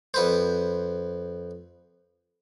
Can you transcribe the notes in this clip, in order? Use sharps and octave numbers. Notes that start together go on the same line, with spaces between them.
F2 B4 C5